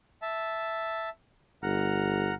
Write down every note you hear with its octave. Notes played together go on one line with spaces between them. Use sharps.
E5 A5
G1 F#5 A#5 F6